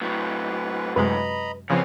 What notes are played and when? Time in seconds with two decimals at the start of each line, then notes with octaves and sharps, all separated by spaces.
0.01 A2 F#3 B4
0.96 F#2 C3 G#3 B4 D#5 A#5 B5
1.70 E2 C#3 F3 C4 B4 C#5 G#5